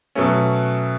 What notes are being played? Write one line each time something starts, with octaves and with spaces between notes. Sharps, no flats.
B2 F#3 A3 C#4